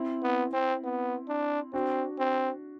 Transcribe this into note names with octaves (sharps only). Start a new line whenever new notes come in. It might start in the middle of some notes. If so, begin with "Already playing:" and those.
Already playing: C4 E4
B3
C4
B3
D4
C4 D4 F#4
C4